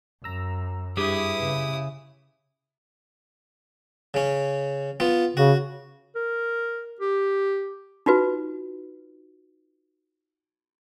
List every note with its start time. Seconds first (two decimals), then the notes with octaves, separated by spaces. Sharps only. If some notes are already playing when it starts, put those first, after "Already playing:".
0.24 F#2 A#5 E6
0.97 G2 E4 G4 G#4 B4 D#6
1.40 C#3
4.14 C#3 C#4
5.00 B3 F4
5.37 C#3 F#4
6.16 A#4
7.00 G4
8.06 D#4 F4 F#4 B4